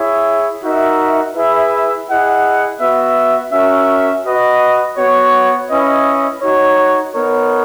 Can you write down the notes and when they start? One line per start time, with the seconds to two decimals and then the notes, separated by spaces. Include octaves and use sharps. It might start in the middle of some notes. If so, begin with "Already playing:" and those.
Already playing: E4 G#4 C#5 E5
0.62 D#4 F#4 A#4 E5
1.34 E4 G#4 B4 E5
2.07 E4 G#4 D#5 F#5
2.79 B3 F#4 B4 E5
3.52 C#4 F#4 A#4 E5
4.24 F#4 B4 D#5
4.96 B3 F#4 C#5
5.69 C#4 E4 B4 D#5
6.42 D#4 F#4 C#5
7.14 B3 D#4 A#4 C#5